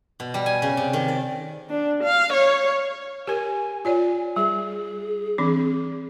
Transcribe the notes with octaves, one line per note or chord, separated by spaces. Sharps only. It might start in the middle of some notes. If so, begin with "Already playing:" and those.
B2
G3
G#5
C#3
C3
D#3
D5
D4
F5
C#5
G4 A#4 G#5
F4 C#5 D5 G#5
G3 G#4
E3 C4 D4